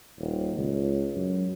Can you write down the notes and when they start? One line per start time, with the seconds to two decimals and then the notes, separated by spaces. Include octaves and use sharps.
0.18 D#1
0.56 C#2
1.15 F#2